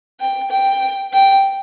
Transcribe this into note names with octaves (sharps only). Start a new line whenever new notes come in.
G5
G5
G5